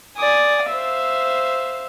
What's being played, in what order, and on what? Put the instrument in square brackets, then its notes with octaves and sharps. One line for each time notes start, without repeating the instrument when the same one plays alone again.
[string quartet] D5 G#5 D#6
C5 E5 F5